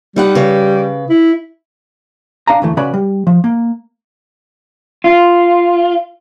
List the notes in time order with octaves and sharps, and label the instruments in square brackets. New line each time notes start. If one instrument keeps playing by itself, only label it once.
[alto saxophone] G3 [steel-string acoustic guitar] D#4 B4 F#5
[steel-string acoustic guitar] C#3 B4
[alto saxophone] E4
[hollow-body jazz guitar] D4 F5 G#5 A#5
D2 E3 A3
C#3 C#4 F#4 B4 D5 B5
G3
F3
A#3
[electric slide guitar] F4